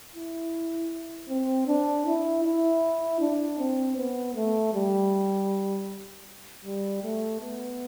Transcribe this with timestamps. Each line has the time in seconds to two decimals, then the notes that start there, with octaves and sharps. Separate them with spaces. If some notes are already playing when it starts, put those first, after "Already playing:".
0.14 E4
1.29 C4
1.67 D4
2.06 E4
2.44 E4
3.20 D4
3.59 C4
3.96 B3
4.35 A3
4.74 G3
6.64 G3
7.03 A3
7.41 B3